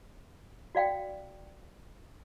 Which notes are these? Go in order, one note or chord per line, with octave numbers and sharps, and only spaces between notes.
F#4 D5 F5 G5